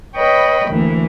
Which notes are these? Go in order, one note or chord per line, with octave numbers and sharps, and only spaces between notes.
B4 C#5 D#5 G5 B5
D2 E3 A#3